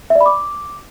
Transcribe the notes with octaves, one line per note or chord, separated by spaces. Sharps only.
E5
D5
B5
D6